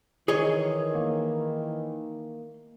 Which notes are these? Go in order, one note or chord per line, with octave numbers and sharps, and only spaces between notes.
D#3 E3 G#4 C#5 D#5
A#3